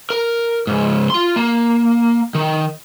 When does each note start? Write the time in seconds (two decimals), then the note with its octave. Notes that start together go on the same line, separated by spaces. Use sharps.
0.10 A#4
0.67 C#2 G#2
1.10 F4 C6
1.36 A#3
2.35 D#3